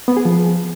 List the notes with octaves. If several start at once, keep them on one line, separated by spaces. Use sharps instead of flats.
B3
G#4
F3